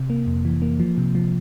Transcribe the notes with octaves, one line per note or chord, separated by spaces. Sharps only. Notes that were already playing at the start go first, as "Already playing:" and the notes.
Already playing: C3
A#3
F2
E3
A#3
F3
C3
F3